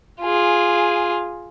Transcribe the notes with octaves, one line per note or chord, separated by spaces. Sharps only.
F4 G#4